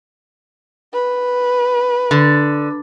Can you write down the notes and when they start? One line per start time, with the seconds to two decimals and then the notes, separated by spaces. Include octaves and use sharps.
0.93 B4
2.11 D3